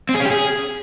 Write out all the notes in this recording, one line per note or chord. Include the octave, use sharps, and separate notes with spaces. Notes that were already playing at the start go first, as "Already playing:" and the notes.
C4
G#4
C#4
G4
G#4